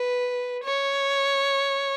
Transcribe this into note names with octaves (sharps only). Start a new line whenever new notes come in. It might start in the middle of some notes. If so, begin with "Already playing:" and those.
Already playing: B4
C#5